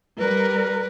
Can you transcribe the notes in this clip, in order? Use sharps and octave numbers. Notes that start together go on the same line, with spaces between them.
G3 A#4 B4